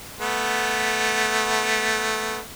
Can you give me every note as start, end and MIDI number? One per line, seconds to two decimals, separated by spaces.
0.20 2.39 57
0.20 2.39 59